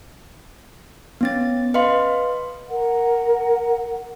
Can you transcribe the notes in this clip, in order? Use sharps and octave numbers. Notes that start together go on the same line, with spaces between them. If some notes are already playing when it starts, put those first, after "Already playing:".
B3 C#4 A6
B4 D#5 F5 C6
A#4 F#5